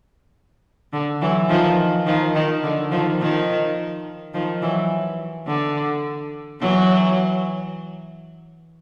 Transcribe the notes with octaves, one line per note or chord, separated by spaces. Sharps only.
D3
E3 F#3
D#3 F3
D#3 F3
D#3
D3
D#3 F3
D#3 F3
D#3 F3
E3 F#3
D3
E3 F#3